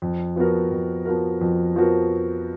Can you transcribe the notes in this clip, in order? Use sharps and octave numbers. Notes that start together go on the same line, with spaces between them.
F2
F3 B3 F#4 A#4
F2
F3 B3 F#4 A#4
F2
F3 B3 F#4 A#4